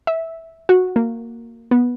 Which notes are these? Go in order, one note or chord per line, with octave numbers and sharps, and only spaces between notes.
E5
F#4
A#3
B3